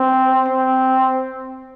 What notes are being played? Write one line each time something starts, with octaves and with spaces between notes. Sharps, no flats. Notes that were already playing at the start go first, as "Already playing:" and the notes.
Already playing: C4
C4